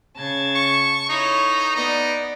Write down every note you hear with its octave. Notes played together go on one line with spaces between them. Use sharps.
C#3 A5 G#6
C#6
D#4 E4 A4 C#5
B3 D#4 D5